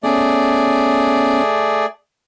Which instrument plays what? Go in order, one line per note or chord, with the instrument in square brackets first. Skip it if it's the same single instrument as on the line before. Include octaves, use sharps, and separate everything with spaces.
[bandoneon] A3 G#4 D5 [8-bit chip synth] B3 C#4 C#5